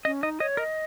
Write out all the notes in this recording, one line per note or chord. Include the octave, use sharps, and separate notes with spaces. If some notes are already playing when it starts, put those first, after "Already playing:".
C#4 D#5
D#4 D#5
C#5 D#5
A#4 D#5